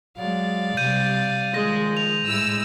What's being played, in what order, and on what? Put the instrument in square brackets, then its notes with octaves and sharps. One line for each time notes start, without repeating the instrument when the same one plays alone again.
[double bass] F#3 G#3 [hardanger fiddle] D5 F5
[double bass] C3 G3 [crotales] G6 D#7
[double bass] D#3 F3 [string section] G#3 [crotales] A#6
[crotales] F7
[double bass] A2 G#3 [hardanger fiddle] E4 [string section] E6